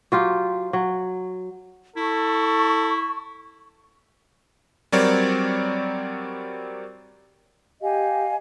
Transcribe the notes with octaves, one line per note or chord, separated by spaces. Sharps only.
F#3 F4 G4
F#3
E4 A4 C#6
F#3 G3 C4 A#4 C#5 D5
G4 D#5 F5 G#5